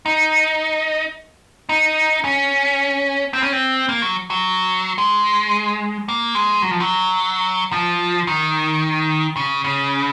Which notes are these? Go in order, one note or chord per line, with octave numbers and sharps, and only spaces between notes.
D#4
D#4
C#4
C4
C#4
C4
A#3
F#3
F#3
G#3
A#3
G#3
F#3
F3
F#3
F3
D#3
C#3
C#3